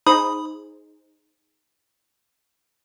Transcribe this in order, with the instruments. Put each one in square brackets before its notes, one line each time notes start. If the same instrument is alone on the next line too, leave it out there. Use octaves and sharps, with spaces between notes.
[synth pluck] D#4 G#4 C5 [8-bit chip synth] B5 D#6